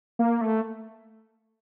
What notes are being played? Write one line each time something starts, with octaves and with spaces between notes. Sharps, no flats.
A#3
A3